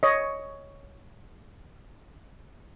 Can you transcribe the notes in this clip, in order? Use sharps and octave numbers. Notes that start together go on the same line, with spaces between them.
C#5 D#5